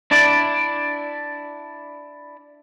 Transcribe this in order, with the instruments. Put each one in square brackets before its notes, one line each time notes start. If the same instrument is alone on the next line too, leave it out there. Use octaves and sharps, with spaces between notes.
[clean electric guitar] D4 E4 D5